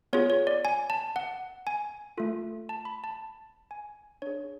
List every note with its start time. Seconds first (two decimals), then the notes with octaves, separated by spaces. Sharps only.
0.13 B3 F4 G#4 C#5
0.30 C#5
0.47 D5
0.65 G#5
0.90 A5
1.16 F#5
1.67 G#5
2.18 A3 F4 A4
2.69 A5
2.85 B5
3.04 A5
3.71 G#5
4.22 D4 G#4 C#5